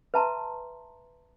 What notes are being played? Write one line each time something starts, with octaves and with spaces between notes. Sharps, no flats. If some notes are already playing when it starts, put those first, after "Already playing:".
B4 E5 A5 A#5 C6